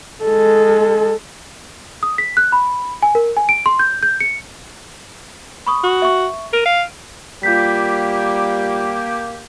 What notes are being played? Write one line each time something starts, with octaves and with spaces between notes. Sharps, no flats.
G#3 A4
D#6
B6
F#6
B5
G#5
A#4
G#5
D7
C6
G6
G6
C#7
B5 C#6 D#6
F#4
E5 C#6
A#4 D7 D#7
F5
G3 A#3 F4 G4 G6 B6